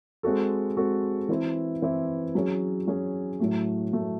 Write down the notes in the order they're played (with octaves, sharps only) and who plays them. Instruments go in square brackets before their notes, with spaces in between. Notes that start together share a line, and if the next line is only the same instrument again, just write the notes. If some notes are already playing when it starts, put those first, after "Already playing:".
[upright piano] G#3 C4 F#4 A4
G#3 C4 F#4 A4
E3 C4 E4
E3 C4 E4
F#3 C#4 G#4
F#3 C#4 G#4
A2 F#3 A3
A2 F#3 A3